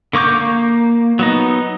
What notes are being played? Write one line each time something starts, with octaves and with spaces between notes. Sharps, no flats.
D3 A#3 C#6 D6 G6
A#3
F#3 B3 D#4